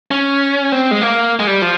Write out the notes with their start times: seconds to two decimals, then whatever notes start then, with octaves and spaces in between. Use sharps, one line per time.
0.11 C#4
0.72 C4
0.91 G#3
1.02 A#3
1.39 G#3
1.47 G3
1.62 F3